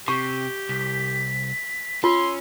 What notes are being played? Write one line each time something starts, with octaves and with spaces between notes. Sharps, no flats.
C3 G4 C#6
C2 B6
C#4 F4 C6 E6